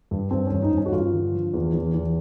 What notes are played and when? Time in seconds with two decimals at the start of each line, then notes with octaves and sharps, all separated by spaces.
0.11 G2
0.31 G2 C4
0.47 C#4
0.52 G2
0.62 D#4
0.72 G2
0.77 C#4
0.86 F#4
0.92 G2 F4
1.12 D3
1.32 F3
1.54 E2
1.74 E2
1.94 E2